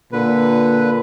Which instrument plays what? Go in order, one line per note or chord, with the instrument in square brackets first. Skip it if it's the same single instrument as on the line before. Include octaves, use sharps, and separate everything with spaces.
[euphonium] A#2 [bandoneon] D3 B4